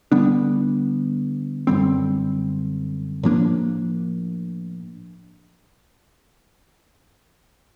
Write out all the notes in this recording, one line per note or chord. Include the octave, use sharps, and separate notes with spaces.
D3 G3 B3 D4
F#2 D3 G3 C4
A2 F3 A#3 D4